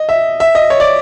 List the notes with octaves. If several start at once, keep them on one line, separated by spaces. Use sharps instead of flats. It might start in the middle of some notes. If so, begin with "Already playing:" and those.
Already playing: D#5
E5
E5
D#5
C#5
D5